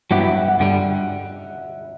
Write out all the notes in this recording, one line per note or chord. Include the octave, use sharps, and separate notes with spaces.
G2 F#3 B3 E4 G4 F#5
E5
F#5
F#5
G2 D3 G3